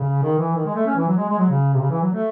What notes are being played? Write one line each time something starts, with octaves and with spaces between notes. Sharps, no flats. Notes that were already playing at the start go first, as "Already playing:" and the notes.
Already playing: C#3
D#3
E3
D#3
G#3
A3
C#4
E3
F#3
G#3
G#3
F#3
C#3
C3
C#3
E3
F#3
A3